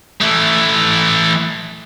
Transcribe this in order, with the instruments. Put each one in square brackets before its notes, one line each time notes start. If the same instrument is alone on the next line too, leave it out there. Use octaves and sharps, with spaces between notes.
[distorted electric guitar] E3 A3